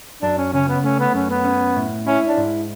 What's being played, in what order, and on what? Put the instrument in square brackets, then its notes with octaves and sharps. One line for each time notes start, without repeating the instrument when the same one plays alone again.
[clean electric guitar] F#2 [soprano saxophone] D4
[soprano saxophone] C#4
[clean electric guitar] C#3 [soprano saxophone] C#4
[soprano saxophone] B3
[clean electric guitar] A3 [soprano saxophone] C#4
[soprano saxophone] B3
[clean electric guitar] F#2 [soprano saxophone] C#4
[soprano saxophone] B3
[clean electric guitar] C#4
A2
[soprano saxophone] C#4 [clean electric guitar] E4
[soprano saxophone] D4
[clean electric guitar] G#2